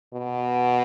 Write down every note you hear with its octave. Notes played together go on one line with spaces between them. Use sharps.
B2